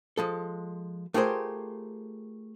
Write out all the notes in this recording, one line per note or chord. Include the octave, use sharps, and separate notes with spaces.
F3 G#3 A4
A3 F4 G4 G#4 A#4 C5